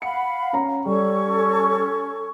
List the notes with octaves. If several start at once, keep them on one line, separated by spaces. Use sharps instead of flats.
F5 F#5 B5 C#7
C#4 A#5
G3 C#4 A4 C#6